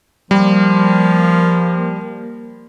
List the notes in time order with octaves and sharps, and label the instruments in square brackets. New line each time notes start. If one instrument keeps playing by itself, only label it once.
[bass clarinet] F3 [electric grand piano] G3 [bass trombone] A#3